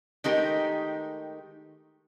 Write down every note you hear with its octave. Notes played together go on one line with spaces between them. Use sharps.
D#3 G#3 A3 D#4 G4 A#4